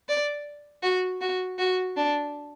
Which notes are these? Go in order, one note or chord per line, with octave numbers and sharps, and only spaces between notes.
D5
F#4
F#4
F#4
D4